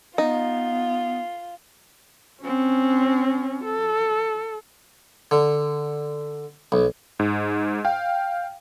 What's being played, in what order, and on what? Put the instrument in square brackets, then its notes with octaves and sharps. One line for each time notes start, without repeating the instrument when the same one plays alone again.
[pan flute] B3 [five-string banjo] D#4 [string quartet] F4
[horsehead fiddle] C4 C#4
A4
[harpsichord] D3
B1
[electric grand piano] G#2
F5 G5